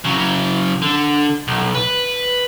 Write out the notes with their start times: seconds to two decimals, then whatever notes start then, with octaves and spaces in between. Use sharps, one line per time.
0.05 C#3 F#3
0.82 D3
1.48 B1
1.75 B4